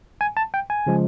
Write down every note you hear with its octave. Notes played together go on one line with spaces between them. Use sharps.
G#5
A5
G5
G#5
C#3 F3 G#3